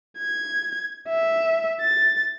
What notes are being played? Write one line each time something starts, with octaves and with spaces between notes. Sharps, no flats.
G#6
E5
A6